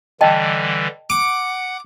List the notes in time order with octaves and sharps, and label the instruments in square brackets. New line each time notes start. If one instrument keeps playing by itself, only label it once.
[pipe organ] D3 E3 G3 [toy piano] D#5 G5 A5
[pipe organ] F#5 [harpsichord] D6